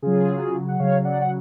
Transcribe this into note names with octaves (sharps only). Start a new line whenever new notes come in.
C#3 F#3 F4 G#4
F#5
C#3 F#3 C#5 F5
D5 F#5
F#5